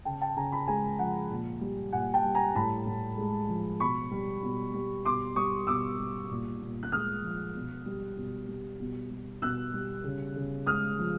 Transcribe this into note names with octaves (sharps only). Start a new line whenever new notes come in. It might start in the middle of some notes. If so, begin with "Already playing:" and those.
C#3 G5 A5
G5 A5
C#3 G#5 A#5
A5 B5
G#3 G#5 A#5
F3 F#5 G#5
A#2
G3
A#2 F#5 G#5
G5 A5
G3
G#5 A#5
A2 A5 B5
A2
G#3
F3
B2 B5 C#6
G3
B2
G3
B2 C6 D6
G3 C#6 D#6
B2 D6 E6
G3
A#2
A#2
F#6
G#3 D#6 F6
F3
B2
G3
B2
G3
B2
G3
B2 E6 F#6
G3
C#3
C#3
G#3 D#6 F6
F3